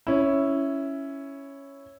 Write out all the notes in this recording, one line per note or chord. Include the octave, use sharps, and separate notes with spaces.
C#4 E4